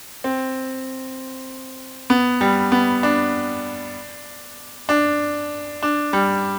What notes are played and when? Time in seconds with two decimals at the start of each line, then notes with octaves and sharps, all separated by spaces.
0.24 C4
2.10 B3
2.41 G3
2.72 B3
3.03 D4
4.89 D4
5.83 D4
6.13 G3